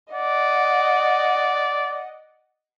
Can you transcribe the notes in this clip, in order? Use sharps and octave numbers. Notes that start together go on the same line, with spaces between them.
D5 D#5 F#5